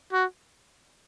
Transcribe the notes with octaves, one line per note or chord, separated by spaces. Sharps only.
F#4